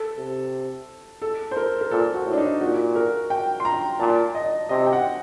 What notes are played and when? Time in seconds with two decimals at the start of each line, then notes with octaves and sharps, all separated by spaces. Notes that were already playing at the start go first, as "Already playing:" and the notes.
Already playing: A4
0.17 C3
1.22 A4
1.51 C5
1.57 A#4
1.81 A#4
1.91 A#2 A4
2.14 F#4
2.25 A2
2.33 D4
2.38 D#4
2.61 A#2 F#4
2.96 A#4
3.30 G5
3.60 C6
3.65 A#5
3.99 A#2 A5
4.35 D#5
4.69 C3 D#5
4.86 G5
4.93 F#5